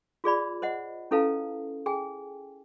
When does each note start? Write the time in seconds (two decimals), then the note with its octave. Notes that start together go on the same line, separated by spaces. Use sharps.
0.24 F4 G#4 D5 B5
0.62 C5 D#5 F#5
1.11 C#4 E4 A4 B4 F5 A5
1.86 G#4 G5 G#5